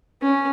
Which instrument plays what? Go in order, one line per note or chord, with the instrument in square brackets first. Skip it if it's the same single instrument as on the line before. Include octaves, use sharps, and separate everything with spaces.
[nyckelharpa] C#4